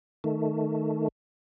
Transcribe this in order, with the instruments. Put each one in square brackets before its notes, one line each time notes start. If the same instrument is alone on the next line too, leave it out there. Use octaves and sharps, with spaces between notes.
[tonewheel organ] D#3 A3